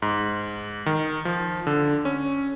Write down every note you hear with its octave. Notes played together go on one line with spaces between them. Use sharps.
G#2
D#3
F3
D3
C#4